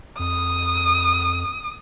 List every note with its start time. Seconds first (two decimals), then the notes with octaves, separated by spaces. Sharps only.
0.19 F2 D#6